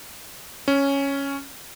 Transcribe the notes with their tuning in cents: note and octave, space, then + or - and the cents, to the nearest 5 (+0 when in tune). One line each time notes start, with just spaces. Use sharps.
C#4 +0